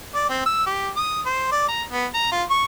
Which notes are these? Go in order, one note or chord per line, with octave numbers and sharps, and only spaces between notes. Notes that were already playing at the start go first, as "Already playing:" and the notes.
D5
C4
E6
G4
D#6
C5
D5
A#5
B3
A#5
F4
C#6